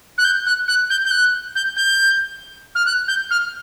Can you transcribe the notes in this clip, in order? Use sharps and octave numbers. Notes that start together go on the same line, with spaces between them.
F#6
G6
F#6
F#6
G6
G6
F#6
G6
G6
F6
F#6
G6
F6